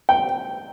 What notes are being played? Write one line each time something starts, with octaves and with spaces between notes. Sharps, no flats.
G5